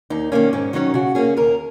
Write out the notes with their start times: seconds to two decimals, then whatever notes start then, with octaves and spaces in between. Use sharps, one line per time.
0.10 D#2 D#4
0.32 D#3 A#3 C#4
0.53 G#2 C#4
0.73 D#3 F#3 C#4 D#4
0.94 C#3 F#4
1.15 A#3 C#4 G#4
1.37 D#2 A#4